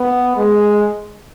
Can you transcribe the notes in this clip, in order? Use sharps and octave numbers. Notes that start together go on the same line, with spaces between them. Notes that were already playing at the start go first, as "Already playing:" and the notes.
Already playing: B3
G#3